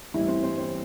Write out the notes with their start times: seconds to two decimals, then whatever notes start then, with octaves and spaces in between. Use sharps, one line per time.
0.14 A1 G2 E3 G3 E4
0.28 C4
0.43 C4
0.58 C4